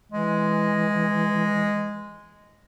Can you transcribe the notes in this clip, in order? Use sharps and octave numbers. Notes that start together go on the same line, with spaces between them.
E3 G#3